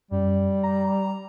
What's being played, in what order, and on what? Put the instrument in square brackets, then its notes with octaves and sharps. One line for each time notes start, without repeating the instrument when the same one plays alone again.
[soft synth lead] F#2 [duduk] G3
[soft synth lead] A#5